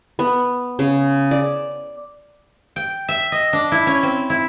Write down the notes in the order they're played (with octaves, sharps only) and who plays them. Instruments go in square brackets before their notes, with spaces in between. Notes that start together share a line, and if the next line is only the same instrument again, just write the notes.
[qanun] B3
C#3
D5
[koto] G5
E5
D#5
D4
E4
C#4
C4
E4